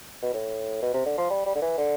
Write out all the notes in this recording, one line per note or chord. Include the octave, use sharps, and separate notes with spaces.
B2
A2
B2
C3
D3
F3
G3
G3
D3
E3
D3